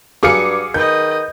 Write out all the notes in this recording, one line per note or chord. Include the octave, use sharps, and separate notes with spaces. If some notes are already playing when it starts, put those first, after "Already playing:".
G2 F#3 G#4 F5 D6 C#7
D#3 B4 D#5 G6